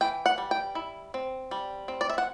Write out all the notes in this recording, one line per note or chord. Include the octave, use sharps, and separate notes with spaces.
E3 G5
F#5
G3
G5
E4
C4
G3
C4
D5
E5
F#5